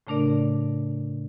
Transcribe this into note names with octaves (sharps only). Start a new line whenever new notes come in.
A2 C#3 A3 D4 A#4 D5